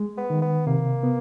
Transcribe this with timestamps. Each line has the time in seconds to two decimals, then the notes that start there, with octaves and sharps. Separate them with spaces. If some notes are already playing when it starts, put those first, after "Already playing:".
Already playing: G#3
0.18 B3
0.30 D#3
0.42 B3
0.67 C3 A#3
1.03 B3